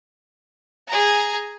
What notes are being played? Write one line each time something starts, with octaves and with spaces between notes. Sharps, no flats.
G#4 A#5